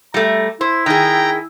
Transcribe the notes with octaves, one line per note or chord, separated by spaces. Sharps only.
G3 A3 A#5
E4 C5
D#3 G#4 G5 A#5